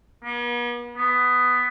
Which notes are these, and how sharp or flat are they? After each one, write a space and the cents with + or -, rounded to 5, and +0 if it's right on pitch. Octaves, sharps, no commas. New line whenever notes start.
B3 -45
B3 +10